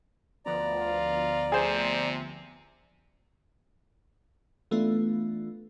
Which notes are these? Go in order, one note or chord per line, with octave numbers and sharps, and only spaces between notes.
D2 F3 B3 D5 A#5
F4
C3 G#4 C5
E3 A3 B3 D4 F4